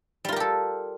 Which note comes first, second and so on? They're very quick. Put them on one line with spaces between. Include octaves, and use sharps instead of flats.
G3 F4 A#4 G4 A4